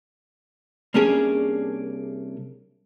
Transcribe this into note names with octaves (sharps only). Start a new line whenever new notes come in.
C2 A#3 C#4 D4 G#4 C#5